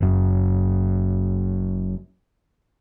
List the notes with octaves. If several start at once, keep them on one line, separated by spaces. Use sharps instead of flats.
F#1 F#2